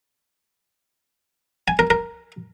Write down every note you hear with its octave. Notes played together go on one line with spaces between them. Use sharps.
G#5
A#4
A#4